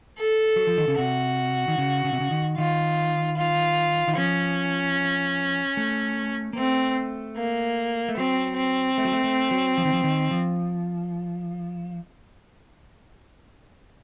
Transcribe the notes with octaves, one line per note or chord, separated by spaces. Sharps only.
A4
F#3
F3
D#3
C#3
C3 F#4
D#3
C#3
C#3
C3
C#3
D#3
D#3 F4
F4
D#3
F3 C#4
A3
A#3
A3 C4
A#3
A3
F#3 C4
C4
A3
F#3
A3
A3
F#3
F3
D#3
F3
D#3
F3